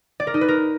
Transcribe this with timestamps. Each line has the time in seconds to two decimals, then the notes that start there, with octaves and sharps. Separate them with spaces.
0.20 D5
0.27 A#4
0.34 D#4
0.41 B4
0.48 A#4